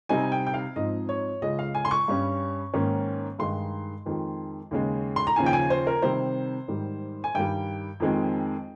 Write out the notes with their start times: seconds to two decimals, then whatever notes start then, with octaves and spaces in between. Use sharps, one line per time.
0.09 C3 G3 C4 D#4 G#5
0.32 G5
0.47 G5
0.54 F5
0.76 G#2 F3 C4 D#4 D#5
1.09 C#5
1.42 C#2 C#3 G#3 C#4 D#5
1.59 F5
1.75 G#5
1.85 C6
1.91 C#6
2.08 G2 G3 C#4
2.73 G#2 D#3 A#3 C#4
3.39 G2 D#3 G#3 D#4 C6
4.06 F2 D#3 G#3
4.71 D#2 C#3 G#3
5.16 C6
5.27 A#5
5.36 D#2 C#3 F3 G#5
5.46 G5
5.53 G#5
5.70 C5
5.87 A#4
6.02 C3 D#3 G3 C4 C5
6.68 G#2 D#3 G3
7.24 G#5
7.35 G2 D#3 G3 G5
8.00 F2 D#3 G#3 C4